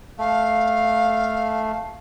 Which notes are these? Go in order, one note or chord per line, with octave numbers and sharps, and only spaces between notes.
A3 F5